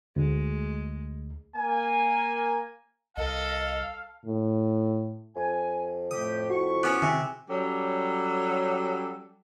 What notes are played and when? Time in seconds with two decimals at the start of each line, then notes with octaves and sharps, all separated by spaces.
0.16 D2 G#3
1.56 A#3 G#5
3.17 C2 A4 D#5 F5
4.26 A2
5.36 F2 G#5
6.11 A2 A3 G4 D#6
6.50 E4 F#4 C#6
6.83 B3 C#4 D6 F#6
7.02 C3 D#3 G#4
7.49 F#3 G3 C#4 G4 A4